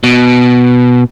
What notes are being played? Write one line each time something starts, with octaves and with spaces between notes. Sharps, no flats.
B2